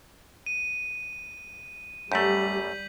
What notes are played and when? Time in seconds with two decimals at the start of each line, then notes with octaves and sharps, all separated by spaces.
0.46 D#7
2.12 F#2 G3 A3 G6 B6 F#7